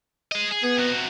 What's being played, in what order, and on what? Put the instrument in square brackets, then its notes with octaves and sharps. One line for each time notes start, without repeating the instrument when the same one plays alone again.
[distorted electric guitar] G#4 D#5
G#4
[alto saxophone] B3 [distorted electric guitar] G#4
[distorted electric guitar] C3 F#4